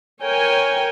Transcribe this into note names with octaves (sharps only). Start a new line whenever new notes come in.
A#4 C#5 G5 G#5